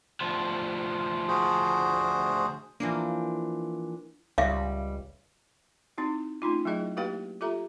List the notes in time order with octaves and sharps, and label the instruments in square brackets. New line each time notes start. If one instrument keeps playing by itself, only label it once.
[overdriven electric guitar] D2 F3
[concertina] F#4 G#4 C5
[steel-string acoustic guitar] E3 F3 D4 [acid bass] A#3
[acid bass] C#2 [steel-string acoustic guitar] G3 [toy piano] E5 F5
[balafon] C4 D#4 E4 F#4
A3 C#4 D#4 F4
F#3 A3 E4 G#4 D#5
A#3 E4 F#4 G4 B4 F5
F4 G4 A4 E5 A#5